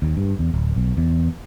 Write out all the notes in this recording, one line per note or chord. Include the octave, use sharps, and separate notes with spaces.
D#2
G2
E2
D1
B1
E2